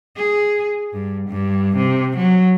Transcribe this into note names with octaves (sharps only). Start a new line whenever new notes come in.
G#4
G2
G2
C3
F#3